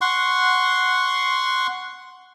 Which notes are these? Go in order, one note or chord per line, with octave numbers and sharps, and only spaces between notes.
F#5 C6 C#6